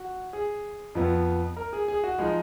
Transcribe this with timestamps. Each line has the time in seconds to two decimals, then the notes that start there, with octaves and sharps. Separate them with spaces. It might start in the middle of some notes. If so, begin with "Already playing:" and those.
Already playing: F#4
0.33 G#4
0.95 F2 F3 B3
1.57 A#4
1.73 G#4
1.88 G#4
2.04 F#4
2.18 F3 G#3 D#4